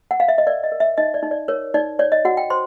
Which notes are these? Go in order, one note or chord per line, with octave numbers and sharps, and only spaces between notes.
F#5
F5
E5
D#5
A#4 D5
D#5
A#4
E5
D#4 D#5
D5
D#4
D5
A#4 C#5
D#4 D5
C#5 D5
D#5
F#4 F#5
G5
C5 C6